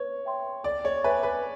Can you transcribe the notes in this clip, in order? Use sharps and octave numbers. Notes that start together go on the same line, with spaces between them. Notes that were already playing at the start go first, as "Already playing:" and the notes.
Already playing: B4 C#5
E5 G5 C6
A4 D5
C#5
B4 C#5 E5 G#5
B4